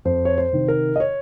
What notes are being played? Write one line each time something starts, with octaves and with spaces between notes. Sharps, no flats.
F2 C5
C#5
C5
C3 D#3
A#4
D#5
C#5